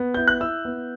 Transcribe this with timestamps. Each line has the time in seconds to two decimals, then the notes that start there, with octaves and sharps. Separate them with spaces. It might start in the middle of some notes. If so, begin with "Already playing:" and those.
Already playing: B3
0.14 E4 G6
0.28 F#6
0.40 E4 E6
0.65 B3